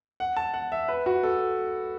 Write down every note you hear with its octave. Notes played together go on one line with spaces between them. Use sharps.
F#5
A5
F#5
E5
B4
F#4
A4